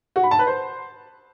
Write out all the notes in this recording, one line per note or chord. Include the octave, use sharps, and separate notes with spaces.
F#4
B5
A5
B4
C5